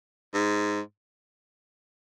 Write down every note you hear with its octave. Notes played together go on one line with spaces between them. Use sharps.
G#2